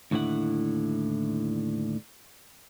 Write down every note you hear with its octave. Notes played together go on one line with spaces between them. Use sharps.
D#2 A2 D3 E4 F#5